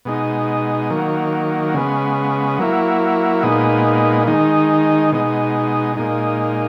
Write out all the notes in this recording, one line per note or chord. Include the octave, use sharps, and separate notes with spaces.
B2 G#3 D#4
D#3 F#3 A#3
C#3 G#3 B3
F#3 A#3 E4
A#2 G#3 B3 D#4
D#3 G#3 D#4
B2 G#3 D#4
A#2 G#3 D#4